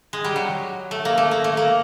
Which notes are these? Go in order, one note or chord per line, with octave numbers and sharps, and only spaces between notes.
G#3
G3
F#3
A3
A#3
A3
A#3
A3
A#3